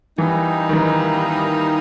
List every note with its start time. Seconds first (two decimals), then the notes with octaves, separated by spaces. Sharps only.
0.18 E3 G3 A#3 D#4
0.69 D#3
0.73 E3